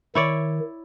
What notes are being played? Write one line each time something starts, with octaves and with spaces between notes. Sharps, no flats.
D#3 E4 C#5 D5